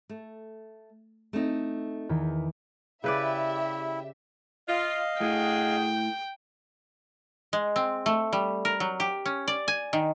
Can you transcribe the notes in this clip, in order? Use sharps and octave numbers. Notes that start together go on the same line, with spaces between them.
A3
A3 C4 D#4
E2 D#3 B6
C#3 E4 G4 B4 D5 E5
F4 D#5 F5
A2 D4 F#4 G#4 G5
G#3
C4
A3
G3
A#4
F#3
G4
C#4
D5
G#5
D#3